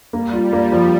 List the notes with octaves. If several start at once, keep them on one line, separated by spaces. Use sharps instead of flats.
G3 A#3
F4
A#3
F3